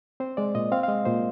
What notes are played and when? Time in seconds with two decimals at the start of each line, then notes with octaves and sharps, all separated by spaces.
0.20 C4 C5
0.37 G#3 D5
0.55 A#2 D#5
0.72 C4 F5
0.83 F5
0.88 G#3 D#5
1.05 A#2 C5